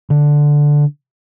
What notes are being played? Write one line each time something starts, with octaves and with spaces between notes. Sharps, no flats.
D3